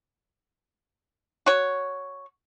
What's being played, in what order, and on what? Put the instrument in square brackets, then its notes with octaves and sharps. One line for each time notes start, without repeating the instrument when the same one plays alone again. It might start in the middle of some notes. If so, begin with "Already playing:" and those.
[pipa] F#4 C#5